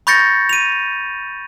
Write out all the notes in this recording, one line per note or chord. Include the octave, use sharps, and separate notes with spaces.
B5 C#6 G6 A6 A#6 C#7
D#7 F7